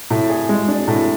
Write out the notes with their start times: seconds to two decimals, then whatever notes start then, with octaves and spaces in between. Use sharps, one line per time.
0.10 A2
0.30 G#4
0.49 G#3
0.68 D4
0.88 A2